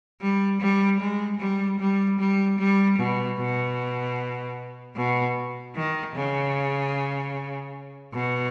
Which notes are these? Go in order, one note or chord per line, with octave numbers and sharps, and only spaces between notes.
G3
G3
G#3
G3
G3
G3
G3
B2
B2
B2
D#3
C#3
B2